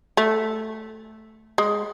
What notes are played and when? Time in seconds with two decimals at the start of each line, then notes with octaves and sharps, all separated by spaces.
0.17 A3
1.58 G#3